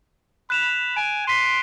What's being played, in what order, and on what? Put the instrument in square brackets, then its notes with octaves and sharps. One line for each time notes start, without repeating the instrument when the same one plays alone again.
[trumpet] B5 [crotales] F#6 E7 F7
[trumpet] G#5 [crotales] D7
[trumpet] C6 [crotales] B6 D#7